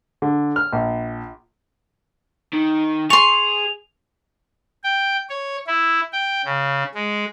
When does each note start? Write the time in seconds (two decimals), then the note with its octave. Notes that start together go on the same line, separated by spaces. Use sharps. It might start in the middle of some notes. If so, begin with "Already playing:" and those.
0.22 D3
0.56 F6
0.73 A#1
2.53 D#3
3.10 G#4 C6 C#6 F7
4.84 G5
5.29 C#5
5.67 E4
6.13 G5
6.45 C#3
6.95 G#3